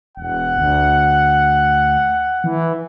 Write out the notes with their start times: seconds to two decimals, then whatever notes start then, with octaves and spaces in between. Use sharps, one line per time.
0.17 E1 F#5
0.57 D2
2.44 E3